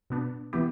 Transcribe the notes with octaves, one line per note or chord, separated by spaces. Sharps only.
B2 B3 D4
E3 B3 E4 G4